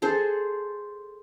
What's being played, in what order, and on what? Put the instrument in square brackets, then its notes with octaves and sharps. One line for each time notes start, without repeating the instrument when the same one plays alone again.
[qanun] G#4 A4 C5